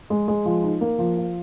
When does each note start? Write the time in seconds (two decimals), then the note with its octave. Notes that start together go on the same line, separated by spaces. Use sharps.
0.10 G#3
0.28 G#3
0.45 F3
0.64 D#4
0.81 A#3
0.99 F3
1.17 F4